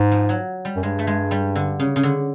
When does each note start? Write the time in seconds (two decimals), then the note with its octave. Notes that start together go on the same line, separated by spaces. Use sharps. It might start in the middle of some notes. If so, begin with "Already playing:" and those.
Already playing: G#2
0.11 F3
0.29 F#3
0.65 G3
0.76 F#2
0.83 G2 G#3
0.99 A3
1.07 G#3
1.31 G3
1.55 D3
1.79 C#3
1.96 C#3
2.03 D3